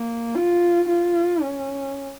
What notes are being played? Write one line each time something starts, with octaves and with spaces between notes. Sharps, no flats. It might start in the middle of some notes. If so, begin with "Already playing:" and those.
Already playing: A#3
F4
F4
C#4